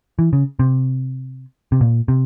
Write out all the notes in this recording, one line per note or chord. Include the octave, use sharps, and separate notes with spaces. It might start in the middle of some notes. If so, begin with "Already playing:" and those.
E3
C#3
C3
C3
A#2
C3